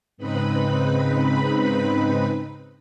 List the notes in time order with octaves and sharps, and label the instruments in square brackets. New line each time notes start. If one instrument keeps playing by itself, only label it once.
[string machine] G#2 C#3 C4 D#4 B4 B5